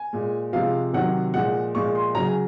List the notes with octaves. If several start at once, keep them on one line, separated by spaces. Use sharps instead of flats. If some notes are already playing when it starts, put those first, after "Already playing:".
Already playing: G#5
A#2 G#3
C3 F3 G#3 F5
C3 D#3 F#3 F#5
A#2 F3 G#3 F#5
A#2 F3 G#3 C#6
C6
C#3 F#3 A#5
G#5